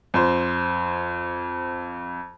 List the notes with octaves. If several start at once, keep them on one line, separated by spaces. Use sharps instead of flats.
F2 C5